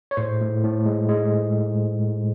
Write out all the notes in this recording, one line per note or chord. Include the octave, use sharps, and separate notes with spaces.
C#5
A2 C5
A2
A2
G#3
G#3